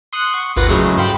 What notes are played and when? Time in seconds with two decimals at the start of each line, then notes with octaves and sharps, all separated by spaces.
0.13 C6 D#6 F#6 C7 C#7
0.34 F#5 C#6
0.56 G#1 D#2 F4 B4 F#5 A#6
0.68 A2 C#3 F#3 G#3 A3
0.97 G2 C5 F5 G5 B5 C#7